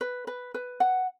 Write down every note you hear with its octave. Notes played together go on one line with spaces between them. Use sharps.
B4
B4
B4
F#5